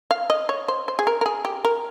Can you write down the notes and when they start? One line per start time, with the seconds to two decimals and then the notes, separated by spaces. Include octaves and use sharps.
0.11 F5
0.30 D#5
0.49 C#5
0.68 C5
0.88 C5
0.99 G#4
1.07 A#4
1.21 A#4
1.26 G#4
1.45 G4
1.65 A#4